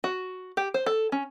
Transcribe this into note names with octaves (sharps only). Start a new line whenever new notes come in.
F#4
G4
C5
A4
C#4